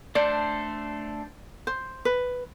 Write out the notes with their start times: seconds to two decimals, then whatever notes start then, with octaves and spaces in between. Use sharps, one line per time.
0.15 A3 D4 A4 C5 D5
1.67 C5
2.05 B4